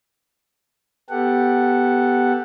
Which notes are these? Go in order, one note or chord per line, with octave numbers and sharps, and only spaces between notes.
B3 G4 A4 F#5